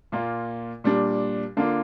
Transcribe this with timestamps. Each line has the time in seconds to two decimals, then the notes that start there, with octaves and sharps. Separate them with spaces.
0.12 A#2 A#3 F4
0.84 A#2 G3 D4
1.57 D3 A#3 D4 F4